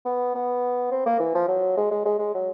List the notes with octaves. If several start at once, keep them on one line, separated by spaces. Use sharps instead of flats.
B3
B3
C4
A#3
E3
F3
F#3
G#3
G#3
G#3
G#3
F#3